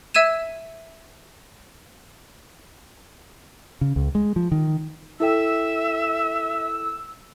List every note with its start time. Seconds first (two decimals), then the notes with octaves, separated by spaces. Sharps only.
0.14 E5 E6 G#6 D#7 E7
3.81 C#3
3.96 C#2
4.15 G#3
4.36 F3
4.52 D#3
5.20 E4 A4 E5 G5 E6